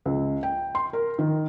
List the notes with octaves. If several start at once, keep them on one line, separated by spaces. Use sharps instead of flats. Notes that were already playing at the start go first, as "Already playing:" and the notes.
C#2
G5
C6
A#4
D#3